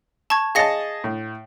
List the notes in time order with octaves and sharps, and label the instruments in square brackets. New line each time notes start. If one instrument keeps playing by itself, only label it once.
[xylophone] A5 C#6 G#6
[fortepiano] G#4 D#5 A5 [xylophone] F5 A#6 C#7
[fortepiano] A2